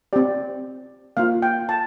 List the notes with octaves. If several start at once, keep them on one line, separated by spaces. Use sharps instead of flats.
C4 G4 D5
A#3 F4 F5
G5
A5